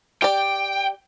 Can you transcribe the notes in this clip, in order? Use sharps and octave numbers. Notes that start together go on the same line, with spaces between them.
G4 D5 G5